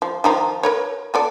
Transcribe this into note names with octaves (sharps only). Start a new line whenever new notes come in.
F3
D#3 F3 A#5
A#4 B4 C#5
B3 A4 D5